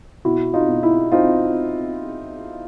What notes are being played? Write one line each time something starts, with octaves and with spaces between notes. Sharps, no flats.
B2 E4 F#4
D#4 F4
B2
E4
C4 D#4 F4